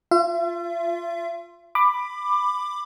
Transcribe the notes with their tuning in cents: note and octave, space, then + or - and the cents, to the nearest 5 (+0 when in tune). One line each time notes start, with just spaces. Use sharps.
F4 +0 E5 +45
B5 +10 D6 +20